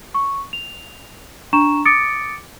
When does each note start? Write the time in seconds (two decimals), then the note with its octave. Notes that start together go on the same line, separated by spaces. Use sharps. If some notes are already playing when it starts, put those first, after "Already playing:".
0.14 C#6
0.53 F7
1.53 D4 A#5 C#6 E7
1.85 D6 D#6 A6 C#7 D7